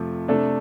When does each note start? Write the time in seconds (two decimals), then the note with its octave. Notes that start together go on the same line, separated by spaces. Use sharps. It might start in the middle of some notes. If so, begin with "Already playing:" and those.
Already playing: F2 C3 A3 F4
0.28 C3 A3 D4 A4